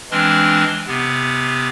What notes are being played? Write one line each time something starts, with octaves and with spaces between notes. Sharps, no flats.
E3 G#3 C4 D4 C6 F6
C3 B3